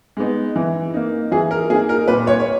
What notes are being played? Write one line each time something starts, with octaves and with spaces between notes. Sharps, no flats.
G#3 B3 D#4
E3
A#3 D#4
E3 G#4
A#4
A#3 D#4 G#4
A#4
A#2 B4
C#5
C#5